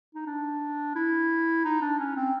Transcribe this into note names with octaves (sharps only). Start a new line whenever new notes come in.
D#4
D4
E4
D#4
D4
C#4
C4